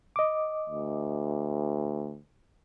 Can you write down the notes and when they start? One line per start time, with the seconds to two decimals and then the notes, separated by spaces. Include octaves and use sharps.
0.16 D#5 D6
0.69 D2